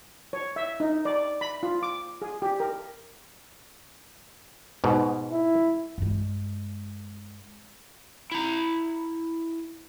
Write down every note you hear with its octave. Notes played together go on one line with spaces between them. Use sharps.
C#5
E5
D#4
D5
B5
F4
D6
G#4
G4
A#4
G#2 B2
E4
G2 G#3
E4 A#5